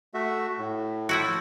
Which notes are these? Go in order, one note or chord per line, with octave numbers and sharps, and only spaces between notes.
A3 F#4 E5
A2
F3 E4 F#4